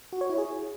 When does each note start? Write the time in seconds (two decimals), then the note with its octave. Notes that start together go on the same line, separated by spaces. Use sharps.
0.13 F#4
0.21 C#5
0.30 E4
0.38 G#4